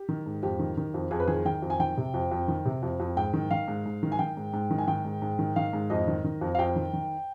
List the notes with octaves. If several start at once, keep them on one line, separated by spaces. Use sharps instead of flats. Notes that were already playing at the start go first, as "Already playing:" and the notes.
Already playing: G4
D#3
G#2
F2 G4
D#3
D#3
F2
F2 G#4
B4
D#3 G#4
D#3 G5
F2
G#5
D#3 G5
C3
F2
F2
D#3
C3
F2
F2
G#2 G5
D#3
D#3 F5
G#2
G#2
D#3
G#5
D#3 G5
G#2
G#2
D#3
G#5
D#3 G5
G#2
G#2
D#3
D#3 F5
G#2
F2 D#5
D#3
D#3
F2
F5
F2 G5
D#3
D#3